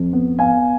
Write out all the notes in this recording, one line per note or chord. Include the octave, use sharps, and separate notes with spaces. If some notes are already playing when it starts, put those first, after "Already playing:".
Already playing: F2
B3
B3 F5 G#5